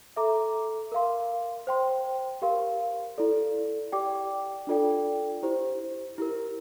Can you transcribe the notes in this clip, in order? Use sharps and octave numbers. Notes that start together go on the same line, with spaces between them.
A4 E5 A#5 D6
A#4 F5 C6
C5 G5 C6
G4 A#4 F5 C6
E4 A4 D5
G4 D5 G5 D6
D4 F4 A4 D5 G5
E4 G4 C5
E4 G4 A#4